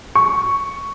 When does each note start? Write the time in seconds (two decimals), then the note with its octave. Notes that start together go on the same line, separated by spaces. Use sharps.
0.15 C#6